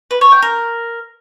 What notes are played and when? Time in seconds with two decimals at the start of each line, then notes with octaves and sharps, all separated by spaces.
0.11 B4
0.21 C#5
0.32 G5
0.42 A#4